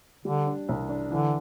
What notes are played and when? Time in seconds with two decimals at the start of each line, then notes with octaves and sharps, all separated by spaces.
0.25 D3 G3
0.47 D4
0.69 C2
0.89 D4
1.10 D3 E3